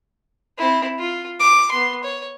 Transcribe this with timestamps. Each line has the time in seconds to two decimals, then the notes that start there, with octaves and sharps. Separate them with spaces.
0.58 C4 E4
0.98 F4
1.40 D6
1.71 B3 C6
2.03 C#5